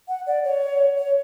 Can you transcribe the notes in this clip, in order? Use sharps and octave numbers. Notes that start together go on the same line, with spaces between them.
F#5
D5
C#5
C#5